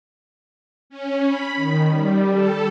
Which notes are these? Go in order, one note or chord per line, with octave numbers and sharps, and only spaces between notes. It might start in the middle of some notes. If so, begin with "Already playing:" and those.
C#4
B5
D#3
G3
A4